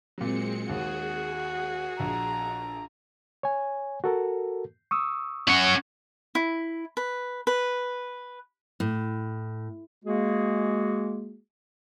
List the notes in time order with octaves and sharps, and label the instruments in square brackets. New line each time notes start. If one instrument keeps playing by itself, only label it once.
[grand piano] A#2 F#3 [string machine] G#3 C4 C#7
[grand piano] D#2 [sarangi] F#4 [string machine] G#4
[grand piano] A#1 [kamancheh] A#5
[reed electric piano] C#5 G#5
F#4 A4 A#4
C#6 D#6 E6
[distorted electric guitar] C#4 F#5
[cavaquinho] E4
B4
B4
[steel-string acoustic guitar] A2
[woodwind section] G#3 A#3 F#4 G#4